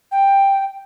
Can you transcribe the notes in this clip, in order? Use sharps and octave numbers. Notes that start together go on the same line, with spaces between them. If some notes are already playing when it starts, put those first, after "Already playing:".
G5